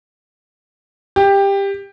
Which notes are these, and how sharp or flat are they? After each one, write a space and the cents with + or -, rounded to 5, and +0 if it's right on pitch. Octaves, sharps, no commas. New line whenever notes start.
G4 +15